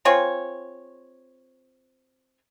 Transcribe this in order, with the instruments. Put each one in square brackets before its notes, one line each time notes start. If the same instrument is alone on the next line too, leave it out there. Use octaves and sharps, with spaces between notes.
[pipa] C4 F4 G#4 C#5